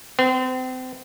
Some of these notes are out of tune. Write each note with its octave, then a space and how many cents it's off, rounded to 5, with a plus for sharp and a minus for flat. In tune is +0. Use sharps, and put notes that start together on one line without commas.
C4 -35